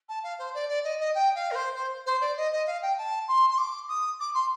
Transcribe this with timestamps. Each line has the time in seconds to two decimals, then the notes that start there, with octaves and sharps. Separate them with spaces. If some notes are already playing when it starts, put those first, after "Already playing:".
0.09 A5
0.23 F5
0.39 C5
0.54 D5
0.69 D5
0.84 D#5
1.00 D#5
1.15 G5
1.35 F5
1.51 A#4
1.55 C5
1.76 C5
2.06 C5
2.21 D5
2.37 D#5
2.53 D#5
2.67 F5
2.82 G5
2.98 A5
3.28 C6
3.50 C6
3.58 D6
3.89 D#6
4.20 D6
4.34 C6